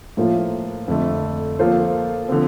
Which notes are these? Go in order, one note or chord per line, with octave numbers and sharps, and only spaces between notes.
A2 F3 A#3 F4 A#4
F2 D3 A3
F3 A#3 F4 A4 C5
D3 F3 C4